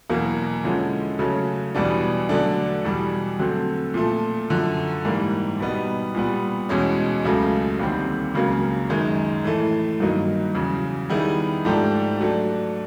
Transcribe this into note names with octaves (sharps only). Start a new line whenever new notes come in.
E2 B2 F#3 A#3
D3 F3 G#3 C#4 E4
C#3 F#3 A3 C#4
E2 B2 G3 B3 D4
D3 F#3 A3 D4
E2 B2 G3
D3 F#3 A3 C4
A#2 F3 A3
F#2 D3 F3
G#2 E3 G3 A#3
B2 G3 B3 D#4
A#2 G3 B3
E2 B2 G#3 C#4
C#2 C#3 F#3 A3
D#2 D3 G3 C4
C#2 C#3 F#3 A#3
F#2 D#3 G#3
A2 E3 A3
G2 D#3 F#3 A#3 D#4
E2 C#3 F#3
D#3 G3 B3 E4 G#4
G#2 F3 A3 D4 G4
F#3 A3 D4